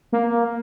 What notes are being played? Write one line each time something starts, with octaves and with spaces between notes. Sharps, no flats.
A#3